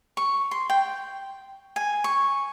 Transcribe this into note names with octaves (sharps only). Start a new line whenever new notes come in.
C#6
C6
G5
G#5
C#6